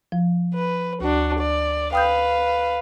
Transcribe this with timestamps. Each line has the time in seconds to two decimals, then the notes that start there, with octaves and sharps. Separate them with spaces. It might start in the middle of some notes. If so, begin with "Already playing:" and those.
0.12 F3
0.54 B4
1.00 D2 D4 F#4
1.39 D5
1.93 B4 F5 G5 D#6 G6